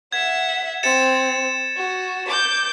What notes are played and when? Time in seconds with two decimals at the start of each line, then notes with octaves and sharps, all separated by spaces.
0.12 E5 F#5 G#6
0.83 C4 A6 C#7 E7
1.77 F#4
2.27 D6 G6